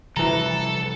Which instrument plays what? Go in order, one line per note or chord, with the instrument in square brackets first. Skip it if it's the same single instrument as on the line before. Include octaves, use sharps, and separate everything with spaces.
[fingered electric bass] C3 F3 G3 [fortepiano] E3 A#5 [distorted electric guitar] A4